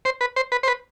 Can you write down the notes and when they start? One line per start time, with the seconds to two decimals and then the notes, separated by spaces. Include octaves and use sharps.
0.05 C5
0.21 B4
0.36 C5
0.52 B4
0.63 C5
0.68 B4